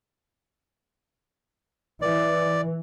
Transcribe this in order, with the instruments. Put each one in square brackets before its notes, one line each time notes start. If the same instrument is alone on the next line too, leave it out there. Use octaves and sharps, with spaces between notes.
[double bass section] E3 [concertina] D5